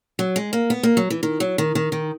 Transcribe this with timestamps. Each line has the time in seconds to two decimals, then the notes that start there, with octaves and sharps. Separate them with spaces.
0.19 F#3
0.36 G#3
0.53 A#3
0.70 B3
0.83 A#3
0.97 F#3
1.10 E3
1.23 D#3
1.40 F#3
1.58 D#3
1.75 D#3
1.92 D#3